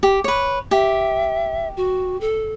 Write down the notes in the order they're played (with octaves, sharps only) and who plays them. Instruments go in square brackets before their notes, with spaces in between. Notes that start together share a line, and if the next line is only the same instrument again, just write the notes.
[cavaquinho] G4
B4 C#5
[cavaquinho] G4 [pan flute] E5
[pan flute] F#4
A4